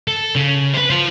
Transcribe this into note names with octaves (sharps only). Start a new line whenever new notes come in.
A4
C#3
B4 C5
F4 C5